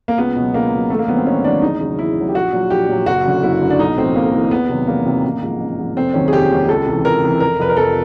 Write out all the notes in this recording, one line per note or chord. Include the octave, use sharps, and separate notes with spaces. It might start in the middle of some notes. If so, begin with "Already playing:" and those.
A#3
C#2 B3
B2 F#3
C#2 A#3
B2 F#3
A1 A3
A#3
G2 D#3 F#3 B3
C4
A1 C#4
G2 D#3 F#3 D4
E2 D#4
C#3 F#3
E2 E4
C#3 F#3
G4
A#1 F#4
A#2 F#3
A#1 G4
A#2 F#3
F#1 F#4
F#2 D3
F#1 E4
F#2 D3
D4
B1 D#4
A2 E3 C4
B1 A#3
A2 E3
E2 B3
C3 D#3 F#3
E2 A#3
C3 D#3 F#3
A1
G#2 F3
A1
G#2 F3
F1 C4
D#2 D#3 F#3 C#4
G#4
F1 G4
D#2 D#3 F#3
C#2 A4
C3 E3
C#2 A#4
C3 E3
F1 A#4
F2 C3 F3 B4
A#4
F1 A4